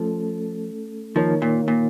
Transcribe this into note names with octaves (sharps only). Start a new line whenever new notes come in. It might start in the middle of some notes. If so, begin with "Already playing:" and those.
Already playing: F3 A3 C#4 A4
D#3 F3 A#3 D#4 A#4 C#5
A#2
A#2